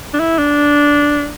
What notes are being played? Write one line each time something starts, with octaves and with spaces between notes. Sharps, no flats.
D4
E4
D4